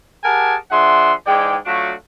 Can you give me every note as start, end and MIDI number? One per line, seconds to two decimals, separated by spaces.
0.24 0.56 67
0.24 0.56 68
0.24 0.56 70
0.24 0.56 78
0.24 0.56 80
0.24 0.56 81
0.71 1.13 53
0.71 1.13 62
0.71 1.13 68
0.71 1.13 76
0.71 1.13 78
0.71 1.13 84
1.27 1.57 44
1.27 1.57 52
1.27 1.57 56
1.27 1.57 74
1.27 1.57 79
1.66 1.93 54
1.66 1.93 57
1.66 1.93 62
1.66 1.93 65
1.66 1.93 66